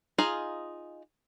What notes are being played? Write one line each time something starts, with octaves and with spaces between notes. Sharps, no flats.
D#4 F4 G#4 D#5 F5